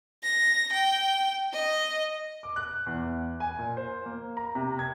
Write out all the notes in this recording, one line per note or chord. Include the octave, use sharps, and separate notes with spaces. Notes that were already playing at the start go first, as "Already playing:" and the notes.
A#6
G5
D#5
D6
F#6
E2
G#5
A#2
C5
A#3
A#5
C3
G#6